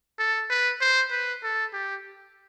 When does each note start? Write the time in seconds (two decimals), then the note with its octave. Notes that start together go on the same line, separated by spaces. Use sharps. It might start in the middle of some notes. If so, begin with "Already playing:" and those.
0.19 A4
0.50 B4
0.81 C5
1.11 B4
1.43 A4
1.73 G4